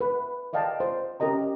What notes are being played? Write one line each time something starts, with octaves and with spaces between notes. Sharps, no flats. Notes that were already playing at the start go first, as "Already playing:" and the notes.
B4
D5 D#5 F5 G5 A5
C5
C#4 G4 A#4 D#5 A#5